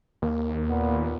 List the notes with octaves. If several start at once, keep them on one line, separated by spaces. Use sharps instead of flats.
D#2 A#3
A#2 B3